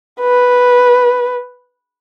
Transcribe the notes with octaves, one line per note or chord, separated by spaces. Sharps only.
B4